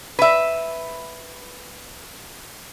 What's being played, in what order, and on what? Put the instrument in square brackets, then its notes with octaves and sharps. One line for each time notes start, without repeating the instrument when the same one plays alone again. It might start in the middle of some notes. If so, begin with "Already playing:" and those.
[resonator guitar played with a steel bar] B4 E5